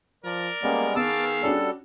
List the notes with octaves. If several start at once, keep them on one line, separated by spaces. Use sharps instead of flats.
F3 A#4 D5
G3 G#3 A#3 B3 C#4
D#3 B3 G#4 F5 A5 D6 E6
G3 C#4 D4 F#4 A4